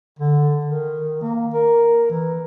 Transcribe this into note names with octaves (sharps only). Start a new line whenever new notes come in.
D3
D#3
A#3
A#4
E3